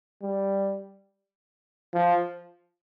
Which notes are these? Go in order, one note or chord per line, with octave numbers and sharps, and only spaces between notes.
G3
F3